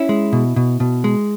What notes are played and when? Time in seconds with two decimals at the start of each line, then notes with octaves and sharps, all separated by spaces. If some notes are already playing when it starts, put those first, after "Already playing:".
Already playing: C#4 E4
0.09 G#3
0.33 B2
0.56 B2
0.80 B2
1.04 G#3